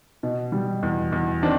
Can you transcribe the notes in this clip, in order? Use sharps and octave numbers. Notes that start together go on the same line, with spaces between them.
B2
G3
E2
E2
D#3 C4 D4